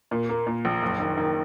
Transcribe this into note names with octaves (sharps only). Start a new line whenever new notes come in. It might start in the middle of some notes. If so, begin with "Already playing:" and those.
A#2
A#3
A#2
A#1
F#1
D#3
D#3